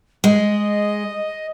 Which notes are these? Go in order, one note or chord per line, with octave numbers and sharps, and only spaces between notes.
G#3 D#5